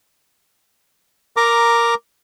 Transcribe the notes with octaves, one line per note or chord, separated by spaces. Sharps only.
A#4 A#5 D6